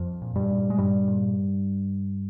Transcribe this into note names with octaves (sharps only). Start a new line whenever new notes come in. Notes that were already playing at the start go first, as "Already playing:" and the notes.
Already playing: F2 F3
A#2
G2 G3
A#2
G#3
G2 A#2 G3
A#2